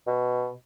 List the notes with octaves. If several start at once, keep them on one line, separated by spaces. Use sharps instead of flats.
B2